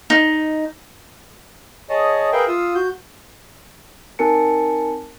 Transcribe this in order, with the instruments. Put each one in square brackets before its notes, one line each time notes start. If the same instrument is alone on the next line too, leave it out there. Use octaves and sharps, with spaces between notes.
[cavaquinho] D#4
[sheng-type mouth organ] G#4 C#5 D#5 A5
G#4 A#4 B4 E5 F5 G5
F4 F5 D#6 E6
F#4 G6
[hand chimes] C4 D#4 A#4 G#5 A5 C#7